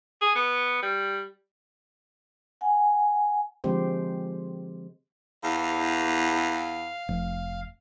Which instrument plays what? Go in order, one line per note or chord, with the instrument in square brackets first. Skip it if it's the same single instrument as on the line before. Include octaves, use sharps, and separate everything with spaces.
[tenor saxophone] G#4
B3
G3
[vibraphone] F#5 G#5
[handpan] D3 F3 G#3 C4 G4 C5
[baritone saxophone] E2 [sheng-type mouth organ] F5
[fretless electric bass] F1